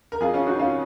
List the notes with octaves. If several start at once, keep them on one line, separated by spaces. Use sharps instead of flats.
A#4
F2 F4 G#4
C#4 F4
D#3 D#4 F#4
C#4 F4